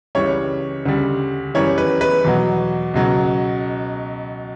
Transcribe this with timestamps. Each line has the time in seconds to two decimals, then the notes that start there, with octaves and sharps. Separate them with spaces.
0.15 C#2 C#3 E3 G3 C#5
0.86 D2 C#3 G3
1.54 F#2 E3 G3 C#5
1.78 B4
2.01 B4
2.25 E2 B2 F#3
2.94 C#2 B2 F#3